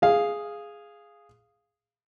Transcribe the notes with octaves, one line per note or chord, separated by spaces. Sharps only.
G#4 F5